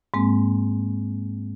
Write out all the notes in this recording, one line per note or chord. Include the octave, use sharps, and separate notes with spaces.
G#2 G#3 A#3 C4